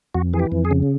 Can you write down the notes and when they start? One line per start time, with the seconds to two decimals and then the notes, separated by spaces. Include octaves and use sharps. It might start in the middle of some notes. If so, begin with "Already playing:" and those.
0.14 F2 F#4
0.33 E3 G#4
0.39 G4
0.52 F2
0.65 G#4
0.71 C#3